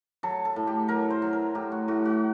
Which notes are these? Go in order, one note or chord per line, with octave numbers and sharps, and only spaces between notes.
F#3 A4
A4
A2
G4
F#3 A#4
C5
F#3
A#4
A2 G4
F#4
A2 F#4
F#4